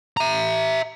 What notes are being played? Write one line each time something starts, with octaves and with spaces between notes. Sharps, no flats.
E5 A#5